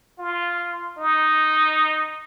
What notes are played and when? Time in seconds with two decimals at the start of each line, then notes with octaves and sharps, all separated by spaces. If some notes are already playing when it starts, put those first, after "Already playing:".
0.19 F4
0.98 D#4